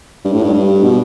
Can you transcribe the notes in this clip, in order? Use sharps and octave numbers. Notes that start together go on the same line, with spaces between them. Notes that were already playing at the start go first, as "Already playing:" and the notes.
G2
A2
G2
G2
B2